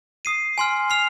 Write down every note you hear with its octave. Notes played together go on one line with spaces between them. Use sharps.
D#6 C7 D#7
G#5 C6 F6
C6 F6 C7 F7